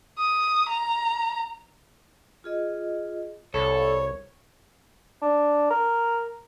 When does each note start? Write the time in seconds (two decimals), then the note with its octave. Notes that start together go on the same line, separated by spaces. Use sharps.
0.19 D#6
0.69 A#5
2.44 F4 G#4 D#5
3.54 C2 A4 C#5 B5
5.22 D4
5.70 A#4